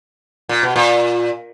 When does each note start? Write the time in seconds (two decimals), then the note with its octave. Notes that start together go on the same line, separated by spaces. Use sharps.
0.49 A#2
0.63 B2
0.76 A#2